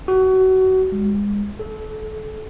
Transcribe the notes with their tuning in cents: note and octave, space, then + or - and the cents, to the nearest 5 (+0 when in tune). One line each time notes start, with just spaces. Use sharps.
F#4 +25
G#3 -30
A4 -30